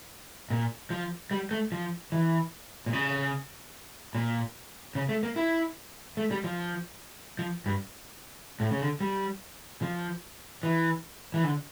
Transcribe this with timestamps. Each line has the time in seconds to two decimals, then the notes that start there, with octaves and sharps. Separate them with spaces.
0.50 A#2
0.90 F3
1.31 G3
1.51 A3
1.72 F3
2.12 E3
2.86 A#2
2.93 C#3
4.15 A#2
4.95 C#3
5.09 A3
5.23 A#3
5.36 E4
6.17 A3
6.31 G3
6.44 F3
7.39 F3
7.66 G2
8.60 A2
8.71 C#3
8.81 D3
9.01 G3
9.82 F3
10.63 E3
11.34 E3
11.44 D3